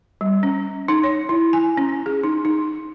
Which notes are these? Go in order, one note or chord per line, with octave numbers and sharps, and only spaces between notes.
G3
C#4
D#4
C#5
E4
G#5
C#4
G#4
D#4
D#4